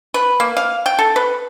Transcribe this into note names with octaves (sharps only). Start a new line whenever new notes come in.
B4
A#3
F5
G5
A4
B4